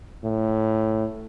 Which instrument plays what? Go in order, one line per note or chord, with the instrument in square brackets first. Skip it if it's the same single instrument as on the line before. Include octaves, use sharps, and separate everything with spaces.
[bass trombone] A2